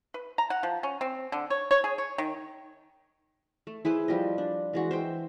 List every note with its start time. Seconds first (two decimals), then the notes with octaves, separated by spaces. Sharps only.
0.14 B4
0.38 A#5
0.50 F#5
0.63 F3
0.83 C#4
1.01 C4
1.32 D3
1.50 C#5
1.71 C#5
1.84 G#4
1.98 C#5
2.18 D#3
3.67 A3
3.85 E4 G#4 B4 C5
4.08 F3 G3 G4 D#5
4.38 D4
4.73 E3 G#3 F#4
4.91 C5 E5 G5